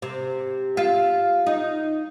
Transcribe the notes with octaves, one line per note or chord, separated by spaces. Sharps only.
C3
F4 E5
D#4